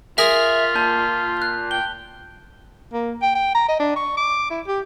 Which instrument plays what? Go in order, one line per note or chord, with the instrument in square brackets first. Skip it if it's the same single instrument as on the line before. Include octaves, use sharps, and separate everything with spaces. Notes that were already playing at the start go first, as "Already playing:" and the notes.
[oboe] F4 [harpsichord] G#4 A#4 [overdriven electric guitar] E5 [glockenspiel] B6 F7
[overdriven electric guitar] A#2 [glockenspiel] A5 G6
[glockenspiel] F#6
[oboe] G5 [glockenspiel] G7
[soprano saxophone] A#3
G5
G5
A#5
D#5
D4
C#6
D6
E4
G4